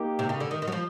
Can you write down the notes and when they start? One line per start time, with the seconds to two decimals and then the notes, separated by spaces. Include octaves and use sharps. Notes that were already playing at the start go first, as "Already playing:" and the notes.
Already playing: A#3 D#4 G4
0.19 C3
0.29 C#3
0.40 D3
0.51 D#3
0.62 D#3
0.67 F#3
0.72 F3